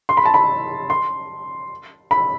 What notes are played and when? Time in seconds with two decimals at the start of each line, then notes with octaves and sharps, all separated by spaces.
0.09 C6
0.17 B5
0.26 A5
0.34 B5
0.90 C6
2.11 B5